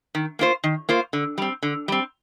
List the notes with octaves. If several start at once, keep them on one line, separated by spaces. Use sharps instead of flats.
D#3
A#3 F4 C5
D#3
A#3 F4 C5
D3
G3 C4
D3
G3 C4